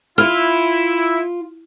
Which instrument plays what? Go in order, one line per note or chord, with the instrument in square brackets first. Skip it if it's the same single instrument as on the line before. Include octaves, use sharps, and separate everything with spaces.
[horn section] E4 [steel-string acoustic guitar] F4 [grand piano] F6